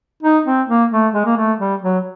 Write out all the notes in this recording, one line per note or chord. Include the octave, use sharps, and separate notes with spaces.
D#4
C4
A#3
A3
G#3
A#3
A3
G3
F#3